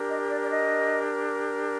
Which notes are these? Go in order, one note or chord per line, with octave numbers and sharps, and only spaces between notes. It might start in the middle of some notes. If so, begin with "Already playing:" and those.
Already playing: D4 G4 A#4
D#5
D5
D5
D#5